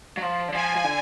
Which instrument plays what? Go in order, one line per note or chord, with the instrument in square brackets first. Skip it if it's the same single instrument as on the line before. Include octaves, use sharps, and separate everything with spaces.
[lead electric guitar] F#3
F3
D3
[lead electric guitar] F3 [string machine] G#5
[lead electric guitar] F3
D3